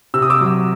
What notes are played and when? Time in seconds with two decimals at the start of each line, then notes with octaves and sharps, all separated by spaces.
0.14 C3 E6
0.22 D#6
0.30 D6 E6
0.41 F#3